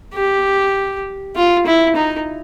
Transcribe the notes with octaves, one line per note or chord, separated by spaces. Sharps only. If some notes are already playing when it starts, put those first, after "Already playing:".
G4
F4
E4
D#4